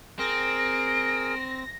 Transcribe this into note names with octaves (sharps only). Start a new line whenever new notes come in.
C4 G#4 A#4 A#6 D7